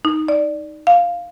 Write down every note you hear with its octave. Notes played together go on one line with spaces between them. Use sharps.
D#4
D5
F5